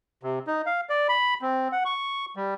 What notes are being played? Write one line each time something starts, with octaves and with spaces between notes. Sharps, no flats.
C3
D#4
F5
D5
B5
C4
F#5
C#6
G3